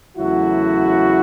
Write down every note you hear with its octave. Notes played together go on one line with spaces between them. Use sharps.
E2 C#3 F#3 A3 E4 F#4